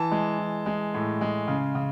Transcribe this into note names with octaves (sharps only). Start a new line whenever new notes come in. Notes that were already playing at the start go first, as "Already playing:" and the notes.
Already playing: E3 A5
G#3
E3
G#3
A2
G#3
C#3
C#3